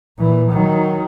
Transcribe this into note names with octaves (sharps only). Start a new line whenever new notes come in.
A#2 E3
D#3 F#3